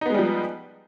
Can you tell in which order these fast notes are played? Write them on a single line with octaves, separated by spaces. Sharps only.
D#4 B3 G#3 G3 F3